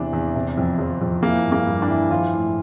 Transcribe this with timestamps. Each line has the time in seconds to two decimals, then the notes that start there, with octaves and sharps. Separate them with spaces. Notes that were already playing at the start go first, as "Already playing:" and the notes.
Already playing: E2 C3 E3 D4
0.13 E2
0.35 C3
0.58 F2
0.79 F3
1.02 F2
1.23 E3 A#3
1.45 G2
1.52 A#3
1.67 G2
1.82 D4
1.88 E3
2.11 F3 F4
2.33 A2